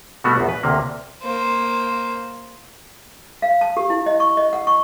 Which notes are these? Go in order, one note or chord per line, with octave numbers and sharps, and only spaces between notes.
B2 G3 A3 B3 F#4
A#1 E2
B4
D2 C3 A#3
A#3 C5
F5
A5
G4
E4
D#5
C#6
D#5
F#5
C#6